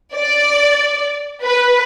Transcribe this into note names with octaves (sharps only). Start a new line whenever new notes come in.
D5
B4